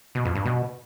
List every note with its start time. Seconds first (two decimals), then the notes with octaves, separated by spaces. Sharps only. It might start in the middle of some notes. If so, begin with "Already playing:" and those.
0.15 B2
0.25 F2
0.35 G2
0.45 B2